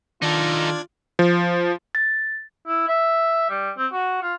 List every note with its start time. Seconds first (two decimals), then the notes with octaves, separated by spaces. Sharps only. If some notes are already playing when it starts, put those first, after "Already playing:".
0.22 D#3 D4 D#4 F4 A4 D5 G#6
1.19 F3
1.95 A6
2.67 E4
2.88 E5
3.50 G3
3.78 C4
3.92 F#4
4.22 F4